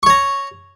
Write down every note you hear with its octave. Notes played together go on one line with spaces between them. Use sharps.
C#5 A#5 C#6